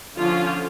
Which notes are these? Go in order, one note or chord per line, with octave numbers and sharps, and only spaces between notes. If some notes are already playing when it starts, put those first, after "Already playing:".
D3 F3 C#4 F4